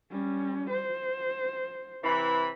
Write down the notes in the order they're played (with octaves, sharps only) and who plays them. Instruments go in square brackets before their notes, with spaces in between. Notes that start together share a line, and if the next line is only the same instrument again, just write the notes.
[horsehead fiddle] G3 C#4
C5
[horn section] C3 E3 B5